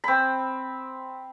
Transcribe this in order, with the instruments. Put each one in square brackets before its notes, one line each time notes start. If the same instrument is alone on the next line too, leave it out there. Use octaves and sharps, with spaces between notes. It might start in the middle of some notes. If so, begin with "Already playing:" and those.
[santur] C4 B5